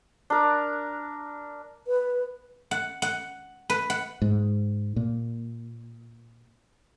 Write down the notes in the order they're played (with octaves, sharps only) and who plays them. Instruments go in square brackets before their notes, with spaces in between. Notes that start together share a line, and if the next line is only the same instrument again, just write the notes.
[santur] D4 A#4
[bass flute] B4
[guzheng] F#5
F#5
B4
F#5
[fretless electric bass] G#2
A#2